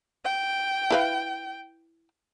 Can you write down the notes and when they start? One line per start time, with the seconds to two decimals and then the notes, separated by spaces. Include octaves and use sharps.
0.25 G5
0.90 E4 B4 F5